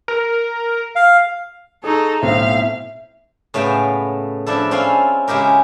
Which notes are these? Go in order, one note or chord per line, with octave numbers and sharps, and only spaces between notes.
A#4
F5
D#4 G#4 A4 C#6
B1 A2 C4 E5 F5
A2 C#3 A3 B3 G5
F3 D4 E4 A4
C4 C#4 E4 F4 F5 G#5
C#3 G#3 E4 G4 A#4